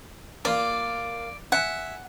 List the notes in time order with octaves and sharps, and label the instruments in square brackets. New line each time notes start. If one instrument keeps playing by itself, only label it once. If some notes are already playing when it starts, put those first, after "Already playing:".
[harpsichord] A#3 F4 [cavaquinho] D5
[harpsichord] E5 G#5 [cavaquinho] F#5